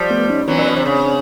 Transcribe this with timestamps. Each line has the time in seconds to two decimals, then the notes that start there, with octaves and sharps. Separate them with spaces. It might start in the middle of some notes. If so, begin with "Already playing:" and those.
Already playing: F3 G3
0.11 A3 B3
0.29 C#4 D#4
0.47 E3 F#3 C4 D4
0.58 A#2
0.68 B2
0.76 C3
0.85 C#3